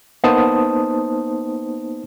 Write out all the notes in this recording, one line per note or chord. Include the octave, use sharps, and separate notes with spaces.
A#3 B3 D#4 C5 A5 D#6